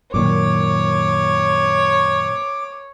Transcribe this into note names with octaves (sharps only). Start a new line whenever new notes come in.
F#2 A#2 D#3 C#5 D6